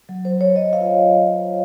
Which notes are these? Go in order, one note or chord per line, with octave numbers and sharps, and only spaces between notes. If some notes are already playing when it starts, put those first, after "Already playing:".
F#3
C5
F#3
C#5
F#3 D#5
F5
F4